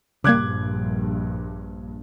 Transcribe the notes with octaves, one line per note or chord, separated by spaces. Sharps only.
A#1 G2 C#3 G3 A#3 D6 F#6 G#6